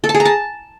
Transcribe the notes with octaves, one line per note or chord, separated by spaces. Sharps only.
A4
A5
G#4
A#5
A5